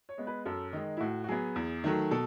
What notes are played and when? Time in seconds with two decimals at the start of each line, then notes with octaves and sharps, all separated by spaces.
0.09 C#5
0.18 G#3 B3
0.27 B4
0.45 F#2 A4
0.73 D#3 G#3 D#4
0.97 E4
1.00 A2 F#4
1.24 F#4
1.28 F#3 B3 G#4
1.56 E2
1.84 D#3 F#3 A3
2.11 B2 A4